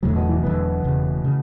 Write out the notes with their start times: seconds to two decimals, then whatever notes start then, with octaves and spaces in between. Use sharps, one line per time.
0.03 E1 E2 A2 D3 F#3
0.16 B2
0.29 E3
0.43 E1 E2 D3 F#3 B3
0.84 E1 E2 C#3
1.24 C#3